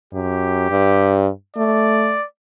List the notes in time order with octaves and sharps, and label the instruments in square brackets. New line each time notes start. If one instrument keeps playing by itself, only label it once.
[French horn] F#2 [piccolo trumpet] G4
[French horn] G2
[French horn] A3 [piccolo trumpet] D5